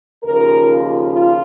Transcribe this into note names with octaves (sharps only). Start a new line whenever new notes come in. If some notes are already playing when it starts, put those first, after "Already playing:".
D#2 C#3 F3 A#4
F4
F4